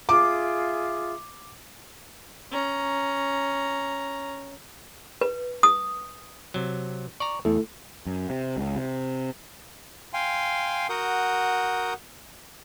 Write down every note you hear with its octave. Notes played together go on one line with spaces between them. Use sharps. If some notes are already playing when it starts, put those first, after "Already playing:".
F4 G#4 E5 D6
C#4 A#5
B4
D#6
C3 F#3
D5 A#5 C#6
E2 A3 E4 A4
F#2
C3
C#2
C3
F5 G5 G#5 C6
F#4 A#4 F#5 D#6 G6